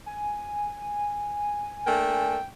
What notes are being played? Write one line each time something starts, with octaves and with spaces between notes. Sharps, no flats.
G#5
A3 A#3 D4 G5